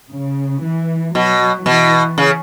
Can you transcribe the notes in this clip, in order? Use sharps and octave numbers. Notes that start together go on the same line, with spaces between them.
C#3
E3
B2 F#3
B2 E3
C#3